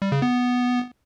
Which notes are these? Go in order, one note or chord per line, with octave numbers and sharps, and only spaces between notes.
G3
C#3
B3